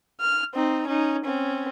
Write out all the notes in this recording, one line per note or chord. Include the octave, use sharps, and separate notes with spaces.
F6
C4 D#4
C#4 D#4
C4 C#4